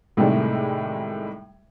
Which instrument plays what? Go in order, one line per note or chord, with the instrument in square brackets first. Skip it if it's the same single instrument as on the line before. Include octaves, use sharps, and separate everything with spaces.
[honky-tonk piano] A2 C3 D#3 G3 G#3